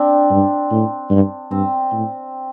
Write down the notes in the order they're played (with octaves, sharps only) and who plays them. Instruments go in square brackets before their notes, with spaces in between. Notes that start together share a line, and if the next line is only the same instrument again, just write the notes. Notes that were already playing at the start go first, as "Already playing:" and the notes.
Already playing: [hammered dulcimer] C4 D4
[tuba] G2
A2
G2
[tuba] G2 [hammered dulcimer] C4
[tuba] A2